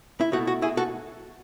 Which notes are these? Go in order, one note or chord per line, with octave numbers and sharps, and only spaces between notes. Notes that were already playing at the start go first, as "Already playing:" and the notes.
E4
B2 A3 E4 F#4
F#4
E4 G#4
F#4 A4